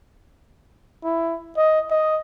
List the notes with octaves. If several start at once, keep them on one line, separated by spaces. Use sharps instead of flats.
E4
D#5
D#5